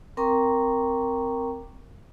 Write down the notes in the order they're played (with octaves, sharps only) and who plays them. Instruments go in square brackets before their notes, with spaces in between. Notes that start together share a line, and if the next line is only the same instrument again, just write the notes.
[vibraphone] C4 A#4 G5 A#5 C#6 D6